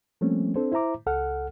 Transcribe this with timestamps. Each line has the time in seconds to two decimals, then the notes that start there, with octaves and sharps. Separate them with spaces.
0.21 F3 G3 A3 A#3 C4 C#4
0.56 C4 D4 A4 C5
0.72 E4 C5 E5 A#5 D6
1.06 C#2 A4 F#5 F6